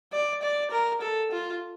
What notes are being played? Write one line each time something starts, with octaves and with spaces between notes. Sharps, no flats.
D5
D5
A#4
A4
F4